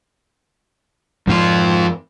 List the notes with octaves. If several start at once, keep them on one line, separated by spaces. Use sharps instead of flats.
F2 G#2 C4 F4